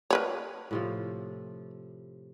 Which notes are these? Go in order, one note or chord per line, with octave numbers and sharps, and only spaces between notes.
A#4 B4 C#5
A2 C3 F3